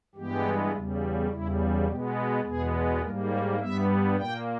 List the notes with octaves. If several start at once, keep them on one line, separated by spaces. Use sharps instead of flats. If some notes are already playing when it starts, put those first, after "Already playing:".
G2 E3 G#3 B3 G4
E2 C#3 G3
E2 C#3 G3 E4
B2 G#3 B3 G4
E2 B2 G#3 B3 G#4
G#2 G3 A#3 A#4
C#5
G2 G3 B3 E5
A#2 A#3 G5